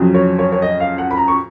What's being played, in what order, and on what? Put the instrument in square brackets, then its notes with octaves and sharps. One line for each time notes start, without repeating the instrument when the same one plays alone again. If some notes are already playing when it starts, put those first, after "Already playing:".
Already playing: [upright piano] F2 C#3 F#3
C#5
C#5
C#5
D#5
F5
F#5
B5
A#5
C#6